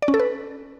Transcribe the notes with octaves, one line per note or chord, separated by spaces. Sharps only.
D5
C#4
A4
B4